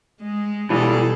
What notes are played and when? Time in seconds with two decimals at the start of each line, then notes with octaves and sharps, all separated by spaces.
0.22 G#3
0.70 B2 E3 G3 G#4 A4